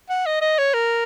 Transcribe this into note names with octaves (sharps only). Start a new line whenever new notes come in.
F#5
D#5
D#5
C#5
A#4